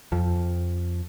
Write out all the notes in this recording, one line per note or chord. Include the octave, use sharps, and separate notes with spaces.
F2 F3